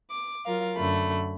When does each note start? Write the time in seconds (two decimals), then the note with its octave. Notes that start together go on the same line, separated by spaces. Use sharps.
0.10 D6
0.46 F#3 F4 A#4 F5
0.77 F#2 D3 A3 B5